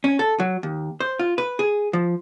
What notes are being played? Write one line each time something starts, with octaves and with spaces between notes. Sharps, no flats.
C#4
A4
F#3
D#2
C5
F4
B4
G#4
F3